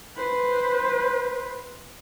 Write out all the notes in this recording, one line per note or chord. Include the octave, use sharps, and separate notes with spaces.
B4 C5